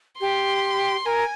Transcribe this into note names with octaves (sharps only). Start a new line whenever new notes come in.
G4 C6
A#4 G#5